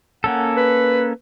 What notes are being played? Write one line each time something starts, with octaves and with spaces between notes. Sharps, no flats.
A#3 C#4 A4 F#5
B4